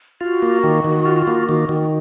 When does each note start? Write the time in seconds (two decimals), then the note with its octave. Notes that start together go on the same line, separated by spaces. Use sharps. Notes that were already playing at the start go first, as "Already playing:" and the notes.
0.21 F4 F#4
0.42 A#3
0.64 D#3
0.85 D#3
1.05 F4
1.27 A#3
1.49 D#3
1.69 D#3